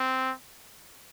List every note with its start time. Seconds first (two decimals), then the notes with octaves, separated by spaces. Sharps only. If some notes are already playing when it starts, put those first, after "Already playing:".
Already playing: C4